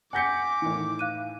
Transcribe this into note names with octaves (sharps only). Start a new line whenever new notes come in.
F#5 G#5 D6 G6 A#6 B6 C#7
A2 D#3 E3
F5 F#6 D#7